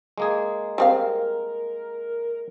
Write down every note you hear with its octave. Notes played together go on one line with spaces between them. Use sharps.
G#3 A#3 G#4
G3 C4 A#4 F5